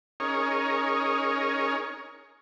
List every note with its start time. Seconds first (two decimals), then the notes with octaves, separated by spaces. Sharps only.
0.20 C#4 D#4 G#4 A#4 C#5